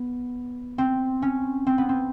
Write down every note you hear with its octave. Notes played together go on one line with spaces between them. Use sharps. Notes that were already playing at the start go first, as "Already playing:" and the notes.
Already playing: B3
C4
C#4
C4
B3
C4